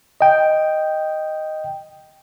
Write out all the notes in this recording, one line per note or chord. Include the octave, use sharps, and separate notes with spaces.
D#5 G5